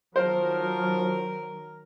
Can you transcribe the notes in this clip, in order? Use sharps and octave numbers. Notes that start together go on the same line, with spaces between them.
D#3 F3 F#3 A#4 C5